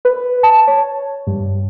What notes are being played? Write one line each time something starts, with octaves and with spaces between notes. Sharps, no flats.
B4
A5
C#5
G2